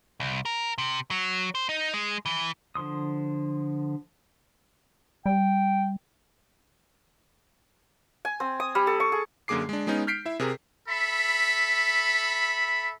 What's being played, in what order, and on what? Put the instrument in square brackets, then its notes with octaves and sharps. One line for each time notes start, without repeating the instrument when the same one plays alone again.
[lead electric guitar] C2
A#4
C3
F#3
C5
D#4
G#3
E3
[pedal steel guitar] D3 F3 C6 D#6
[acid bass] G3 [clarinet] G5
[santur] G#5
C4
D#6
G3
A4
C#6
G#4
[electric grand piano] F#2 D3 A#3 G#4 D6 C7
G#3 D4
G#3 B3 C#4 D#4
F6 G6 B6 C7 D7
E4 E5
C3 G#4 A#4
[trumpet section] A4 E5 B5